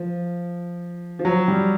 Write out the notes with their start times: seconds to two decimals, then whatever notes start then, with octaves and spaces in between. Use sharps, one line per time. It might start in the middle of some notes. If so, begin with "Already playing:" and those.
Already playing: F3
1.19 F3
1.25 F#3
1.48 G3